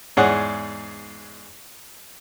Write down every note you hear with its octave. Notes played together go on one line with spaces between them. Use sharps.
E2 G#2 G#4 C#5 D5 F#5